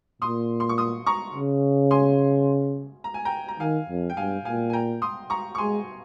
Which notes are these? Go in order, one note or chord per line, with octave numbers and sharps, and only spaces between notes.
A#2 C6 D#6
C6
C#6
C6 D#6
A#5 C#6
C#3
G#5 C6
A#5
G#5
G5 A#5
A#5
D#3 F5 G#5
F2
G5
G2 F5 G#5
A#2 F5 G#5
G#5
G5 A#5
C6 D#6
A#5 C#6
C#6
G#3 G#5 C6